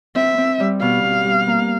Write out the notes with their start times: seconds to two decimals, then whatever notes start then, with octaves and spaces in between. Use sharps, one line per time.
0.16 C4 E5
0.38 C4
0.60 G3
0.81 B2 F5
1.04 B2
1.25 G3
1.48 A#3